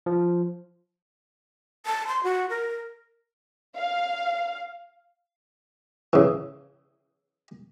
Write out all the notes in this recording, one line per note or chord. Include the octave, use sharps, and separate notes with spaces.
F3
A5
C6
F#4
A#4
F5
C#3 E3